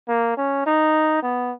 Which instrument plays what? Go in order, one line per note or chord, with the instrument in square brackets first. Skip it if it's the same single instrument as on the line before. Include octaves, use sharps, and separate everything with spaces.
[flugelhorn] A#3
C#4
D#4
B3